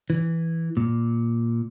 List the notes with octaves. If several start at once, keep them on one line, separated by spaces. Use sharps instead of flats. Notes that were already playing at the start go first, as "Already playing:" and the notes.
E3
A#2